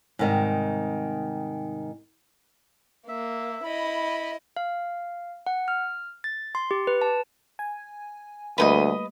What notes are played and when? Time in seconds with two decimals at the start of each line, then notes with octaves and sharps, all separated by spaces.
0.19 G#2 C3 D#3 G3
3.08 A#3 E5
3.64 E4 D#5 B5
4.57 F5
5.47 F#5
5.68 F6
6.24 A6
6.55 C6
6.71 G4
6.87 B4
7.02 A5
7.59 G#5
8.58 D2 G3 A3 A#3 B4 C5 D#5